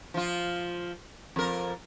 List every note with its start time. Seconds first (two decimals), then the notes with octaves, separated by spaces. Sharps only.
0.14 F3 F4
1.36 F2 A#4